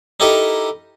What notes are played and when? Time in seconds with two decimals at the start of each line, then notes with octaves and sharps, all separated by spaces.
0.20 D#4 E4 G4 A4 A#4 D#5